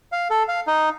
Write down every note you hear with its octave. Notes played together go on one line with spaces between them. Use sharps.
F5
A4
F5
D#4